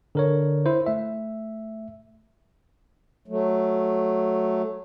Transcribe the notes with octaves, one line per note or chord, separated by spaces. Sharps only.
D3 A#4 C#5
E4 C5
A3 E5
F#3 A3